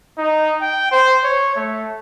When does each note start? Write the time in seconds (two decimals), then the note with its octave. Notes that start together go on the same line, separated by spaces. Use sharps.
0.18 D#4
0.62 G5
0.92 C5
1.24 C#5
1.56 A3